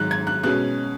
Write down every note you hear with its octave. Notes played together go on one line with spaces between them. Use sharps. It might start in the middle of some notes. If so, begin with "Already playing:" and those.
Already playing: G#2 D#3 F#3 F#6
G#6
F#6
B2 G#3 C#4 F#6